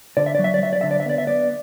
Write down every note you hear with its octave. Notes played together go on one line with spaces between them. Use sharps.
D3 D5
E5
D5
F#3
E5
D5
F#3 E5
D5
D3 E5
D5
E5
B3 D5
E5
B3 D5